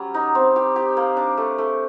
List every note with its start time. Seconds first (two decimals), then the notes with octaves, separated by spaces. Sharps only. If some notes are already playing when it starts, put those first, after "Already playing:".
Already playing: F#3 G3 C#4
0.14 D#4
0.35 C4
0.56 G4
0.76 G4
0.97 A#3
1.17 D4
1.37 A3
1.58 A3